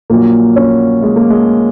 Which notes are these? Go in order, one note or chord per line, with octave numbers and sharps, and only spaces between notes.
A#1 A#2 F#3 A#3
C#4
G#3
A#3
G#3